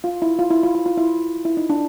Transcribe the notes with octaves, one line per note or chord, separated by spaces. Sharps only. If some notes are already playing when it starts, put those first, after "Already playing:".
F4
E4
F4
E4
F4
F4
F4
E4
E4
D#4
D4